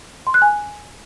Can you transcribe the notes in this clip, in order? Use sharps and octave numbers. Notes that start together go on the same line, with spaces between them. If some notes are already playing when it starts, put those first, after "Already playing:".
C6
F#6
G#5